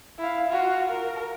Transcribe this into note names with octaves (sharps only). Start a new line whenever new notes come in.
E4 F5
F4 F#4
A#4